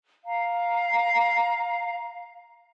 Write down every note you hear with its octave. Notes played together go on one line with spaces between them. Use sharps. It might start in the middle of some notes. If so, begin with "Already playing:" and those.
F5 A#5